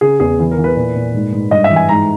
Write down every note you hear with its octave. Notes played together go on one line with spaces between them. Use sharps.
C#3 G#4
E2 G#4
E3
A#4
E3
B4
A#2
A#2
G#2
G#2
G2 D#5
E5
E3
G#5
G#2 A#5